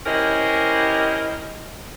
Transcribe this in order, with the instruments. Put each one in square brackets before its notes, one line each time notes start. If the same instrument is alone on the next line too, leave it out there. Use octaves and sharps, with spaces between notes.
[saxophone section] C#4 E4 G4 A#4 C5 D#5